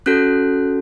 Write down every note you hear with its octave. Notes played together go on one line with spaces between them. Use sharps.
C#4 F#4 A4 F#6